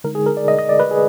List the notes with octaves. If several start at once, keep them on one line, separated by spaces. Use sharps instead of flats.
D3 G#3 D#4 A#4
G#4
A#4
D5
D#5
D#5
D5
B4
G#4